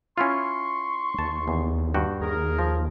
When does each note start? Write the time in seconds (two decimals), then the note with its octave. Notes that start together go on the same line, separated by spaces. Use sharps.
0.18 C#4 E4 F4 C6 C#6
1.19 D#2 A5
1.48 E2
1.94 G2 F#4 G5
2.21 D#2 G#4 A#4
2.59 F3